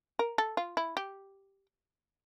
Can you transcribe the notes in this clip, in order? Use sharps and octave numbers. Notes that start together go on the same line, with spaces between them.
A#4
A4
F4
E4
G4